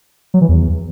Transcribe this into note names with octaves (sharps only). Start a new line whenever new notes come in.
F#3
E3
E2